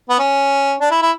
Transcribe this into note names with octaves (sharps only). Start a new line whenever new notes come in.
B3
C#4
D4
E4
E4